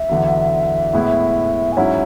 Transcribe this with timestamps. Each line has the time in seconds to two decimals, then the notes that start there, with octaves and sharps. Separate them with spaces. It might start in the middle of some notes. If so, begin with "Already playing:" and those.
Already playing: E5
0.09 E2 D3 F#3
0.93 A2 G#3 B3 E4
1.72 G#5
1.77 G#2 F#3 C#4 E4 F#5